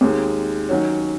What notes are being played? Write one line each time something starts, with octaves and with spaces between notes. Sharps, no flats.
D#2 D#3 G#3
D#3 F#3 C#4 F#4 C#5